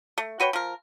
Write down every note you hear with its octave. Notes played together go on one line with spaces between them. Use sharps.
A3
F#4 B4 C#5 G5
F3 A#4